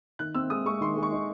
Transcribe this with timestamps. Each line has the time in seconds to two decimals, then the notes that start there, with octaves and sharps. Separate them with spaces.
0.19 D#3 F#6
0.35 C4 E6
0.50 G#3 D#6
0.66 G#3 C#6
0.81 D#3 C6
0.97 G#3
1.03 C#6
1.12 D#4